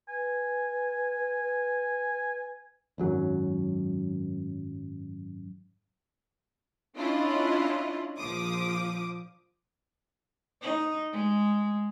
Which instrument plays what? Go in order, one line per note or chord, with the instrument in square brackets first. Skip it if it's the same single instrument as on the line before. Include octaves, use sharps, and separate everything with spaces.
[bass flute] B4 [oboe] G#5
[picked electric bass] G#1 F#2 F#3
[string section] C#4 D4 E4 F4 D#5
A#1 F3 D6 D#6
[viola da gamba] D#4
G#3